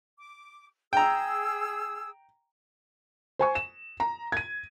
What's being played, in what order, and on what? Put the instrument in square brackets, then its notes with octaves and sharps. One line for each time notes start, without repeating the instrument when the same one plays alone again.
[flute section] D6
[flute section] G#4 E6 [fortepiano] G5 A#5
[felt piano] C5 G#5 C#6
E7
A#5
G#6 D#7